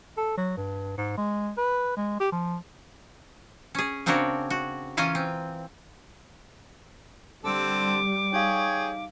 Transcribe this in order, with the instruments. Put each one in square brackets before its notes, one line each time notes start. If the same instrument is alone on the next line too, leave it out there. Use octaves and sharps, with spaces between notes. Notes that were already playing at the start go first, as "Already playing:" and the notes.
[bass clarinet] A4
F#3
G2
G#2
G#3
B4
G#3
G4
F3
[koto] C#4 G#4
C#3 C4 D4 F#4 A#4 C#5
F#4
E3 C#4 F4 G#5 A#5
C4
[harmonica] D3 C4 A4 [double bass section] G3 [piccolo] D6
[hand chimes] D#4 F5 [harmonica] G#4 C#5 G5